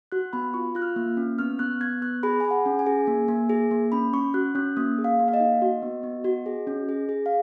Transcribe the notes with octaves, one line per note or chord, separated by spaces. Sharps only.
F#4 F#6
B3 B5
F4 C#6
F4 F#6
F6
A#3
C#4
B3 F6
B3 F#6
B3 G#6
B3 F#6
G#4 B5
G#4 G#5
F#5
C#4
G#5
G#4
A#3
A#3
G#4
A#3
C#4 B5
C#4 C#6
F#4 F#6
C#4 F#6
A#3 D#6
G#4
F5
A#3
F5
D#5
D#4
F#4
B3
B3
F#4
G#4
C#4
G#4
G#4
F5